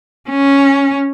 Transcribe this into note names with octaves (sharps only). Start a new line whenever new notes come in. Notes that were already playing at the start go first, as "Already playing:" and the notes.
C#4